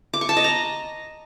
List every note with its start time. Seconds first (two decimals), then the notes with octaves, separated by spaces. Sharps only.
0.14 D6
0.21 C#6
0.29 A5
0.37 D#5
0.44 A#5